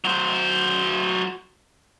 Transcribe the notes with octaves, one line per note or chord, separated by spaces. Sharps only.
F#3 C5